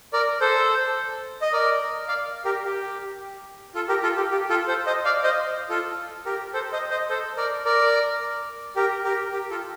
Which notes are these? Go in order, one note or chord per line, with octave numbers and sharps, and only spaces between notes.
A#4 D5
A4 C5
D#5
A#4 D5
D5 F5
G4 A#4
G4
F4 A4
G4 A#4
F4 A4
G4
G4
F4 A4
A4 C5
C5 D#5
D5 F5
C5 D#5
F4 A4
G4 A#4
A4 C5
C5 D#5
C5 D#5
A4 C5
A#4 D5
A#4 D5
G4 A#4
G4 A#4
G4
F4 A4